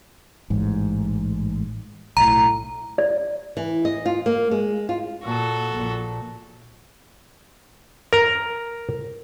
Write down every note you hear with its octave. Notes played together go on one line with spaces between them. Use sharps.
A1 G#2
B1 A2 A#5
D5
E3
D#5
F4
A#3
G#3
F4
A#2 F#4 A4
A#1 A#2
A#4 A#5